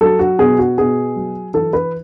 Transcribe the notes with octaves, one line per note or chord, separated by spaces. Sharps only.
F#3 A4
F#4
B2 G#4
F#4
B2 G#4
F#3
E3 A4
B4